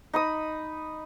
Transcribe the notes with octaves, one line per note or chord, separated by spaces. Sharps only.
D#4 B5 D#6